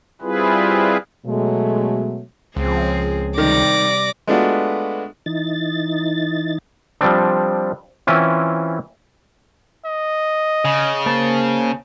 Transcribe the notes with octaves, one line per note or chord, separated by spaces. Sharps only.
G3 C4 E4 F4 G#4 B4
B2 F#3 G#3 A3
C#2 F3 C4 G#4
C3 D#3 G3 D5 D6 A#6
G#3 A3 B3 D4 F4 F#4
E3 D#4 A6
F3 G3 C4 D4
E3 C4 C#4 E4 F4
D#5
C#3
A#3 C5 A5